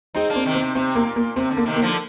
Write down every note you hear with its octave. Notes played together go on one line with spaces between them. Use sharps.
G#3 C4 D#4
A#3 D4
C4
C3 D#3
C4
C3
C3 C4
A#3
A#2
A#3
C3 C4
D3
A#3
C3 D#3
A#3
D3 F3